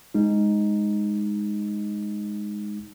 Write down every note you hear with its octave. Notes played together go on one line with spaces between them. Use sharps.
G#3 D#4